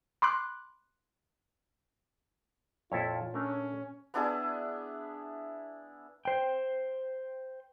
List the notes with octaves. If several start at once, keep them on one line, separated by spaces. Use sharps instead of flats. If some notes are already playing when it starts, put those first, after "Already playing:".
B5 C6 D6 F#6
F2 A#2 E4 F4 A4 C#5
A3 C#4 D4 A#4
B3 D4 E4 G#4
C5 G5